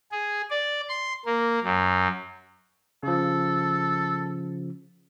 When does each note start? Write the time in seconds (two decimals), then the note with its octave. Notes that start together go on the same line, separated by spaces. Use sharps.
0.11 G#4
0.50 D5
0.89 C6
1.25 A#3
1.64 F#2
3.03 C#3 F3 A4